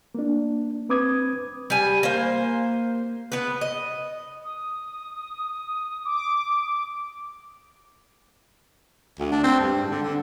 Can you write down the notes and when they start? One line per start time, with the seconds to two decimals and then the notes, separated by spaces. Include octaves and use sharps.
0.15 A#3 D4
0.89 C4 B4 D6 D#6 G#6
1.70 G3 G#5
2.03 A#3 C5
3.32 B3 B4
3.61 D#5
4.44 D#6
6.05 D6
9.19 D2
9.32 D4
9.44 C4
9.60 G2
9.75 G#2
9.90 D3
10.02 D3